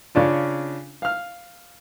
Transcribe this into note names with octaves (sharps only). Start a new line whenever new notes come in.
C#3 C#4 D4 F4
F5 F6